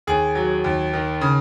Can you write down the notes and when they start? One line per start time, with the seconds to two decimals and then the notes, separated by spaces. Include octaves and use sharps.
0.07 D#2 G#4
0.35 F#3
0.64 D#2
0.93 D#3
1.21 C#3